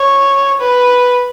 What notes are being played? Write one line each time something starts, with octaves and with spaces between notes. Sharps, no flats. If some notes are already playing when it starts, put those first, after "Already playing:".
Already playing: C#5
B4